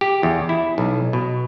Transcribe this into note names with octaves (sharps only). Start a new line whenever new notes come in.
G4
E2
E4
B1
B2